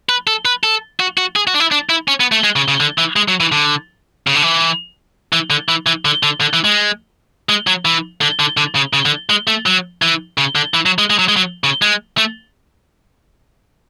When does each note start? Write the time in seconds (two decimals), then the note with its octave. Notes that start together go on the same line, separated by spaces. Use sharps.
0.09 B4
0.27 A4
0.45 B4
0.64 A4
1.00 F#4
1.18 F#4
1.36 G#4
1.47 F#4
1.54 D4
1.60 E4
1.72 D4
1.89 E4
2.08 C#4
2.20 B3
2.32 A3
2.44 G#3
2.56 C#3
2.68 C#3
2.80 D3
2.98 E3
3.16 G#3
3.28 F#3
3.40 E3
3.52 D3
4.27 C#3
4.35 D3
4.42 E3
5.33 E3
5.50 D3
5.69 E3
5.86 E3
6.05 D3
6.23 D3
6.41 D3
6.53 E3
6.64 G#3
7.49 G#3
7.67 F#3
7.85 E3
8.21 D3
8.39 D3
8.57 D3
8.75 C#3
8.93 C#3
9.06 D3
9.29 G#3
9.47 A3
9.66 F#3
10.02 E3
10.38 C#3
10.55 D3
10.74 E3
10.86 F#3
10.98 G#3
11.10 G#3
11.19 F#3
11.28 G#3
11.37 F#3
11.64 C#3
11.82 G#3
12.18 A3